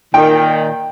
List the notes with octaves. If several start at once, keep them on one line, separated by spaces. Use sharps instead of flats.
A#2 D#3 G5